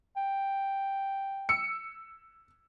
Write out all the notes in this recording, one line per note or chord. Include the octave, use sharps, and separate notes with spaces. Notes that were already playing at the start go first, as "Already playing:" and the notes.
G5
E6 C#7